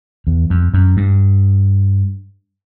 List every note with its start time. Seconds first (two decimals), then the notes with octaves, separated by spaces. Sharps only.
0.27 E2
0.50 F2
0.74 F#2
0.97 G2